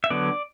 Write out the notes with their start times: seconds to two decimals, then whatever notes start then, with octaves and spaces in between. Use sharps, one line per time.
0.04 E5
0.10 D3 F#3 B3 D5